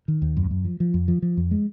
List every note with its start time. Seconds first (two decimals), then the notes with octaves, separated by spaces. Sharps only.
0.08 D#3
0.22 D#2
0.37 F#2
0.51 F#2
0.65 F3
0.80 F3
0.94 F2
1.08 F3
1.22 F3
1.37 F2
1.51 G#3